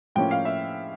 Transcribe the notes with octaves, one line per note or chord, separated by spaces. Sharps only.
A2 F3 A#3 C#4 G5
F5
E5